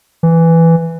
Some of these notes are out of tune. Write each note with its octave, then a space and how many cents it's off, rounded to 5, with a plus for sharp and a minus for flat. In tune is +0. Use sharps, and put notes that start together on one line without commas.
E3 +5